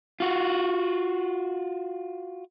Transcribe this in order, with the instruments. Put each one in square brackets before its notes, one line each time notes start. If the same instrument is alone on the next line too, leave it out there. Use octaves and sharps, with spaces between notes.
[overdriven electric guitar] F4 F#4